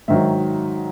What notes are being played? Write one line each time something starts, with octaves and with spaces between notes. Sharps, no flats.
G#2 D#3 F#3 E5